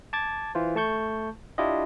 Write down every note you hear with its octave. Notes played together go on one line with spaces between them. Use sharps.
A5 D6 G#6 A6
E3 F4 C5
A3 A5 C#6 G6
D4 E4 F4 G4 D#5